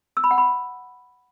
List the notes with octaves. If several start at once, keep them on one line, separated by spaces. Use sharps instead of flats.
E6
B5
F#5
B5